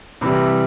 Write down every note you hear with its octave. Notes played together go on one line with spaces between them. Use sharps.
C3 E3 G3 B5